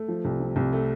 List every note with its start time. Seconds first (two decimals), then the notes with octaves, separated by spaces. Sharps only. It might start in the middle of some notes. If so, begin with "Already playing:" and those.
Already playing: A3
0.08 F3
0.25 C2
0.40 C3
0.56 C2
0.73 A3